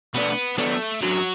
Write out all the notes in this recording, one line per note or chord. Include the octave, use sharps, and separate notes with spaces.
B2 A3 B3 D4 A4 D5
F#3 A3 B3 D4 B4 D5
F#2 E3 F#3 D4 F#4